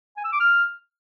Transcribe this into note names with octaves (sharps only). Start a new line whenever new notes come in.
G#5
E6
D6
F6